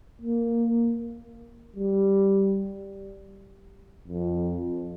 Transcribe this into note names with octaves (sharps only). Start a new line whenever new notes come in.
A#3
G3
F2